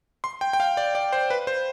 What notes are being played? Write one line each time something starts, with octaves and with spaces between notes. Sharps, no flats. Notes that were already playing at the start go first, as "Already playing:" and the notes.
C6
G5
G5
F5
D5
D5
C5
B4
C5